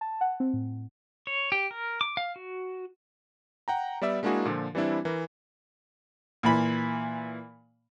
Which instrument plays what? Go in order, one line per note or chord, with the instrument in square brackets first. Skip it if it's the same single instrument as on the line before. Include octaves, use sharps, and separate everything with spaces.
[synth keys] A5
F#5
C4
A2
[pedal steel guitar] C#5
G4
A#4
D6
F5
F#4
[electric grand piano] F#5 G5 A#5
G3 B3 D5 E5 E6
G#3 A#3 D4 E4 F#4 G#4
A#2 D3 F3
E3 G3 C4 D4 E4
E3 A#4
[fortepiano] A#2 E3 B5